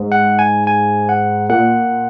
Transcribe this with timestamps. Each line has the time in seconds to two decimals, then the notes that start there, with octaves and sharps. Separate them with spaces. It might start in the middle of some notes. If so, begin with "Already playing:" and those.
Already playing: G#2
0.12 F#5
0.39 G#5
0.67 G#5
1.09 F#5
1.49 A#2 F#5